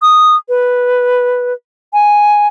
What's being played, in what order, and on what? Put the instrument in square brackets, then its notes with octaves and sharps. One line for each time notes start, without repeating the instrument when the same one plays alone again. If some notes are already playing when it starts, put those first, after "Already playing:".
[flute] D#6
B4
G#5